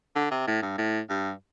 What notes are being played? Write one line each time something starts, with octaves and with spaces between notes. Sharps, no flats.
D3
C3
A2
G2
A2
G2